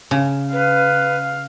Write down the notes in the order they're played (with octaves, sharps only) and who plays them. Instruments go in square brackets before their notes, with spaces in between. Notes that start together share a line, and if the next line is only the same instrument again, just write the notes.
[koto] C#3
[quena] B4 [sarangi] F5